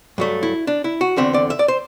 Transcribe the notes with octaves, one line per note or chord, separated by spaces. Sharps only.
G2 F#3 A3
E4
D4
E4
F#4
E2 D3 A3 C4 E5
D5
E5
D5
C5